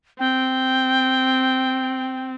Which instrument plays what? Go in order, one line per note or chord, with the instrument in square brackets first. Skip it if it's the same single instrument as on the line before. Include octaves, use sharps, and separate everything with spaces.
[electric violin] C4 [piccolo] G5